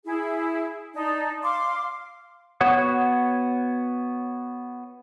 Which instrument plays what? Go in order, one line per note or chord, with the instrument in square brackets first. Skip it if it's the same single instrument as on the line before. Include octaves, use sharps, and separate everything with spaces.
[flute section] E4 G#4
D#4 D5 A5
F5 C6 D6
[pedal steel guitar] B3 F#4 C#5 F#5 D#6